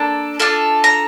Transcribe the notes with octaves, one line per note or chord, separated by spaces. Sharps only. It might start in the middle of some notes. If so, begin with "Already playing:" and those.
Already playing: A#3 D4 A4
D4 F4 A4
A#5